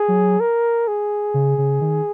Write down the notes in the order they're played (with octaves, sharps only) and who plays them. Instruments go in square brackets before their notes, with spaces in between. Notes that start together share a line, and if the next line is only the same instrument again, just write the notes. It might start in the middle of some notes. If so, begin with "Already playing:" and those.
Already playing: [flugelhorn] G#4
[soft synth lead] F#3
[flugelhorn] A#4
G#4
[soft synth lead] C#3
C#3
D#3